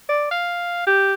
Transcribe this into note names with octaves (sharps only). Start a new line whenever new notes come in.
D5
F5
G4